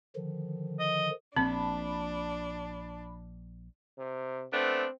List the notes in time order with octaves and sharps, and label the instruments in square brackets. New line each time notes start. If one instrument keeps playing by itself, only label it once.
[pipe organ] D3 D#3 F3
[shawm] D#5
[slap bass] A#1 A#2 [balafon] C4 [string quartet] D4 [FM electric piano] A5 B5
[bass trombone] C3
[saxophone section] A3 B3 D4 [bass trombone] C4